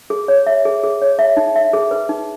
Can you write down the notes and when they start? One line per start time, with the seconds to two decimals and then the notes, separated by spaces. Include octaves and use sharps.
0.10 G#4
0.28 C#5
0.47 E5
0.65 G#4
0.83 G#4
1.02 C#5
1.19 E5
1.37 D#4
1.56 E5
1.73 G#4
1.91 B4
2.09 D#4